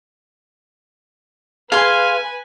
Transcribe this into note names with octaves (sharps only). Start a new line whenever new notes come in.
G#4 B4 F5 G#5 C6